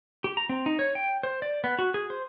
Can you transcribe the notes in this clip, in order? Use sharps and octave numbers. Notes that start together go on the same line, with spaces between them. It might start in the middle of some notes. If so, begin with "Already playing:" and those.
G4
A#5
C4
D#4
C#5
G5
C5
D5
B3
F#4
G#4
C5